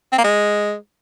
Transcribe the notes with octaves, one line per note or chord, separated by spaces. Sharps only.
C4
A#3
G#3